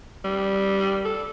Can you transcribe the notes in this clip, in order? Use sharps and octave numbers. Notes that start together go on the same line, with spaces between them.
G3
A4